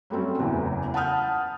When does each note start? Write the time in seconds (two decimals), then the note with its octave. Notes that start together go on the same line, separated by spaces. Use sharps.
0.10 F#3 G3 A3 C4 C#4
0.39 F#1 E2 A2 E3
0.94 F#5 A5 B5 D#6 F6 G6